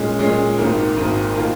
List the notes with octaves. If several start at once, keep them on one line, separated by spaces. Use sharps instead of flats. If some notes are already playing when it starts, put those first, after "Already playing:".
Already playing: A#2 G#3 C#4
A#2 G#3 C#4
G#1 G#2 D#3 A#3
G#1 G#2 D#3 A#3
D#3 A#3 F4